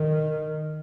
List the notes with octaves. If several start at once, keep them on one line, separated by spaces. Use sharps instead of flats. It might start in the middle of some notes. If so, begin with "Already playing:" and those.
Already playing: D#3